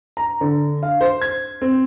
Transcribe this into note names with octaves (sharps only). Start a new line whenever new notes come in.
A#5
D3
F5
C5
G#6
C4